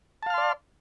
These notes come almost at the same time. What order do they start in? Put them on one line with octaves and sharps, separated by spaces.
A5 F5 F6 C6 D5